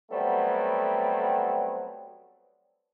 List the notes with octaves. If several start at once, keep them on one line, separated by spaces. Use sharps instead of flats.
F#3 G3 A3 B3 C4